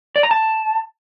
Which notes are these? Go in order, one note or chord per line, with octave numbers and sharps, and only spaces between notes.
D5
A#5
A5